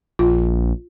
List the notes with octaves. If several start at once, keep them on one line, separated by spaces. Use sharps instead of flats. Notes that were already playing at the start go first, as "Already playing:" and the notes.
A#1 F4